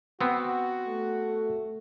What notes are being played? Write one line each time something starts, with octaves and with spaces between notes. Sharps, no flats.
B3 C4 F#4
A3